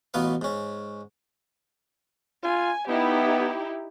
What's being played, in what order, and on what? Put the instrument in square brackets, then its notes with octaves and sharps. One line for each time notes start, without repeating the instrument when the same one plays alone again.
[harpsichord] A1 B2 B3 B4 F5
G#2 C#4
[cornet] F4 [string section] G#5
[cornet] B3 [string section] D#4 E4 G4